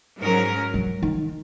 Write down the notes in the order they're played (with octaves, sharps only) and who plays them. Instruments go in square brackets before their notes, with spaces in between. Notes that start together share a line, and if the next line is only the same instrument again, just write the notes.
[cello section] G#2 F#3 C#4 A#4
[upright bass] F#3
D#3